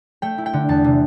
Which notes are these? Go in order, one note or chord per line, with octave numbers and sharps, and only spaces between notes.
A3 G5
E4
G5
D3
E2 A5
C3